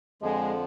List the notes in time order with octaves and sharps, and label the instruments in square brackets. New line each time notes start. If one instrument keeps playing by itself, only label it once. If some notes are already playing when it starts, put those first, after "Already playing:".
[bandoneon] F2 D3 F3 [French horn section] G#3